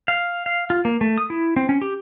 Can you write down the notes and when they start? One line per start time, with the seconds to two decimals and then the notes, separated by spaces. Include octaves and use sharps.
0.08 F5
0.46 F5
0.70 F4
0.85 A#3
1.01 A3
1.18 D#6
1.30 E4
1.56 C4
1.69 C#4
1.82 G4